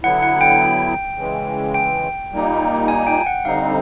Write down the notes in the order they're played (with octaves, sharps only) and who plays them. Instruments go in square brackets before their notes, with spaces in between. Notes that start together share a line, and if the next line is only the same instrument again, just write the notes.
[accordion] D3 F#3 B3 E4 [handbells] F#5
[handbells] F#5
G5
[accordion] C#3 E3 G#3
[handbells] G5
[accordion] A#2 G3 A#3 D#4
[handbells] G#5
G5
F#5
[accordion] D3 G3 C4 D#4 [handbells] F5